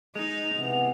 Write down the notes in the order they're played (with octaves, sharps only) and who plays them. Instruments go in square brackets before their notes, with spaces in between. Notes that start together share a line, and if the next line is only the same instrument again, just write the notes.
[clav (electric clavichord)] G#3 [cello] D#4 [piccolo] F7
[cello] C3 [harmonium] E3 B3